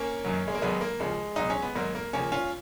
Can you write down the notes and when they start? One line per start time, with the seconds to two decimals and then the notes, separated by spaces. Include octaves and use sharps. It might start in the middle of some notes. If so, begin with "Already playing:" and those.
Already playing: A#3 C#4
0.24 F#2 D#3 F#3
0.48 G#3
0.55 A#3
0.62 D#2 D#3 F#3 G#3 B3
0.81 A#3
1.00 D#2 C#3 F3 G#3
1.36 C#2 B2 F#3 D#4
1.50 C#4
1.62 B3
1.75 G#2 D#3 F#3 A#3
1.95 A#3
2.13 D#2 C#3 F3 A#3 C#4
2.32 C#4 F4